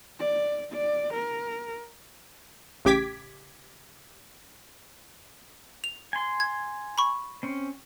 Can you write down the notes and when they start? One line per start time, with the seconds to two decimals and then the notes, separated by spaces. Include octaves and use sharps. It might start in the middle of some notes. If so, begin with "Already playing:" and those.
0.19 D5
0.72 D5
1.13 A#4
2.85 A1 C#3 G4 D6 G#6 B6
5.84 F7
6.13 G#5 C6
6.40 G#6
6.98 B5 C#6
7.43 C4 C#4